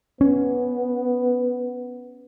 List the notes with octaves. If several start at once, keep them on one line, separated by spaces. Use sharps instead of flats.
B3 C#4